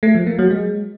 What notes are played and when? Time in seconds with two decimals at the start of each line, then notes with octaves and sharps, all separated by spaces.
0.03 A3
0.15 F3
0.27 A#3
0.39 F#3
0.51 G#3